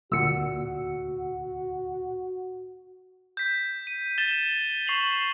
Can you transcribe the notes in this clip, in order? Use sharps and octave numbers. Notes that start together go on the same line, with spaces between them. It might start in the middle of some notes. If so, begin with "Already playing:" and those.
D2 A#2 F#4 F#5 E6 C#7
G6 B6
D#7
A6 E7 G7
C#6 C7 F7 F#7